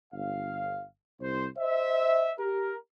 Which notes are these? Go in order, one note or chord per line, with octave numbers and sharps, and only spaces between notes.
G1 F5
C2 C5
C5 D#5 E5
G4 A#4